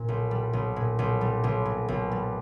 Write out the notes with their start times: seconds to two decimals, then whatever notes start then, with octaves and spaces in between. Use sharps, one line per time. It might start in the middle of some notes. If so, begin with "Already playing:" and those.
Already playing: A#2
0.08 B1
0.31 G3
0.53 B1
0.76 A#2
0.99 B1
1.21 G3
1.44 B1
1.65 A#2
1.88 B1
2.12 G3